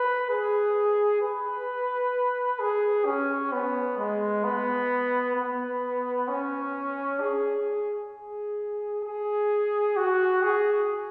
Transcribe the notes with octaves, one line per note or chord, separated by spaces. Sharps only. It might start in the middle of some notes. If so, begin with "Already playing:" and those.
Already playing: B4
G#4
B4
G#4
C#4
B3
G#3
B3
B3
C#4
G#4
G#4
G#4
F#4
G#4